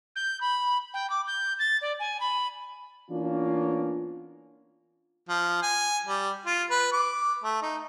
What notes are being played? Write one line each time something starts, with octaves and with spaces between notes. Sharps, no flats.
G6
B5
G5
D6
G6
A6
D5
G#5
B5
E3 A#3 B3 C#4 D4 F4
F3
G#5
G3
F4
B4
D6
A3
D#4